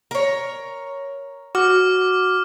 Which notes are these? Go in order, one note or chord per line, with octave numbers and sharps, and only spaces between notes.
A#4 C#5
F#4 D6 F6